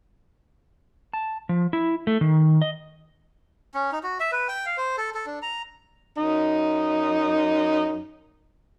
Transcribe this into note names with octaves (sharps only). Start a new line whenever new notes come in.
A5
F3
E4
A3
D#3
D#5
C#4
D#4
F#4
E5
B4
G5
F5
C5
A4
A4
D4
A#5
F#2 D#4